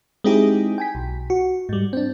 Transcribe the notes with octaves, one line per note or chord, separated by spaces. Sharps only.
G#3 C4 D#4 E4 G4 G#4
G5 G#5 B6
B1
F#4
G#2 G3
C4 D4